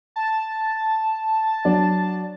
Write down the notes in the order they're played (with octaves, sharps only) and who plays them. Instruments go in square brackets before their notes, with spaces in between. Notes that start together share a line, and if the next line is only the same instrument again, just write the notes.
[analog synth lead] A5
[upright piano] F#3 D4